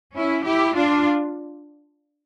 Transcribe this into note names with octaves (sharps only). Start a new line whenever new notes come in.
C#4 E4
E4 G4
D4 F4